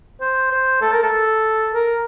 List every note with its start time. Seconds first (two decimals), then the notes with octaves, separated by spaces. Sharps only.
0.21 C5
0.51 C5
0.82 A4
0.92 A#4
1.03 A4
1.74 A#4